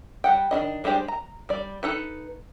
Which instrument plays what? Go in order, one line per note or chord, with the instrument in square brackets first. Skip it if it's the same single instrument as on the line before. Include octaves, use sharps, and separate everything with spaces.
[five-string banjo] G3 F#5 G5
D#3 D4 E4 D#5
G3 G#3 D4 G4 C5
A#5
G3 D5
D#4 A4 B4